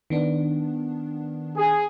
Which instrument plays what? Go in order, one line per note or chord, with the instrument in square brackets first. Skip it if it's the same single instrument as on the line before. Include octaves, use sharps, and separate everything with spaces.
[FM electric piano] D#3 B3 D4
[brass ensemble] G#4